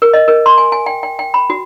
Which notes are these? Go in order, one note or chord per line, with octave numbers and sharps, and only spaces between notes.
A#4
D#5
A#4
C6
G#5
G#5
G5
G5
G5
B5
F#4